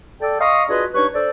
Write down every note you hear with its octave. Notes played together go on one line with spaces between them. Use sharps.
A4 D5 G5
D#5 F5 A#5 C6 C#6 D#6
D4 F4 F#4 G#4 B4 D#5
G2 D4 D#4 B4 C#5 C#6
D4 A4 C5 D5